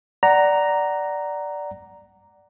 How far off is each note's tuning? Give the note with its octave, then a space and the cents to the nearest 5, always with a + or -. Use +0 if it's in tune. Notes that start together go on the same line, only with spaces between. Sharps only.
D5 +0 F#5 +20 A#5 +0